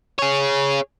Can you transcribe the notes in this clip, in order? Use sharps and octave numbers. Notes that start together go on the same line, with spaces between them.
G#4 C#5